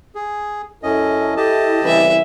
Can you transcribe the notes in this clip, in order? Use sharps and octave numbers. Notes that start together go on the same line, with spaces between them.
G#4
F#2 C#4 E4 A4 D#5
G4 D#5 A5
C2 C#3 E3 B4 E5